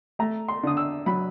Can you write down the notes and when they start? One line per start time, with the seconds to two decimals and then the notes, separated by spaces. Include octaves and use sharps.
0.19 A3 A#5
0.48 C6
0.63 D3 D#6
0.77 E6
1.06 F#3 B5